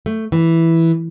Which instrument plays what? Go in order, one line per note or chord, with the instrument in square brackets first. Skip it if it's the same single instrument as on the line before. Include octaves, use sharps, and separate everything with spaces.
[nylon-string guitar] A3
E3